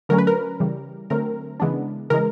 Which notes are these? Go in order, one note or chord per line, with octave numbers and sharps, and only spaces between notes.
D3 F#3 A3 C#4 A#4
B4
A#4
C#3 E3 G3
D3 F#3 A3 C4 A#4
C#3 E3 G#3 B3 D4
C#3 E3 G#3 A#4